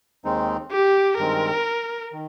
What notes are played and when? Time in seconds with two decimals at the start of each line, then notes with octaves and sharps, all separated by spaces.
0.24 D#2 D#3 G#3 C4 D#4
0.71 G4
1.18 G2 D#3 G#3 C4 A#4
2.13 D#3